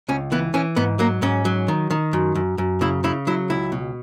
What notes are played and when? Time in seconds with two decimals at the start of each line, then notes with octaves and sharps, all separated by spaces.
0.08 C#2 C#4
0.32 E3 B3
0.54 E3 C#4
0.76 G#2 B3
0.99 F#3 A#3
1.22 G#2 C#4
1.45 F#3
1.68 D#3
1.90 D#3
2.13 F#2
2.35 F#2
2.58 F#2
2.81 C#3 E4
3.04 C#3 E4
3.27 F#3 E4
3.50 C#2 E4
3.72 B2